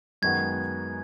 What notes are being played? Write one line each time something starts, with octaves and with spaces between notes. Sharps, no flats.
F#2 D#3 G#3 B3 F#4 G#6